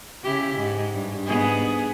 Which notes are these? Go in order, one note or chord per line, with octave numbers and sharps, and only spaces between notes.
C#3 E4 G4
G#2
G2
G#2 B3 G#4